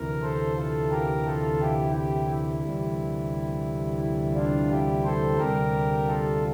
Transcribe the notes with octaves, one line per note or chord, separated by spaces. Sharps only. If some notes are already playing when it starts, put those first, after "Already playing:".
Already playing: D2 C3 E3 A#4
A4 C5
F4 A4
G4 A#4
F4 A4
E4 G4
E4 G4
E4
D2 C3 E3 G3
E4
D4 F4
E4 G4
A4 C5
D2 C3 G3 G4 A#4
F4 A4